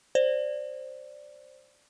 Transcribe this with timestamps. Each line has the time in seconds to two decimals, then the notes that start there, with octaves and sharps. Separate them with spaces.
0.15 C5 D5